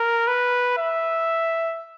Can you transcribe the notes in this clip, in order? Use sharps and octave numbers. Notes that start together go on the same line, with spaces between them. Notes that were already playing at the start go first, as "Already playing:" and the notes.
Already playing: A#4
B4
E5